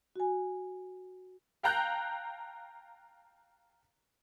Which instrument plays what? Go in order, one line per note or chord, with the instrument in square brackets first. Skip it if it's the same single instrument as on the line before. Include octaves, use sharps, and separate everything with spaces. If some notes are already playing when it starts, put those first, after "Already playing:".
[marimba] F#4 G#5
[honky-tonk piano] F5 G5 A5 A#5 F#6 G6